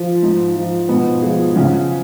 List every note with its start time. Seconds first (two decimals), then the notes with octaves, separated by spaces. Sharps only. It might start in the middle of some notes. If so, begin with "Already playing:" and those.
Already playing: F3
0.23 G#2
0.56 F3
0.89 G#2 B2 B3
1.22 F3 G#3 G#4
1.55 C#3 F#3 C#4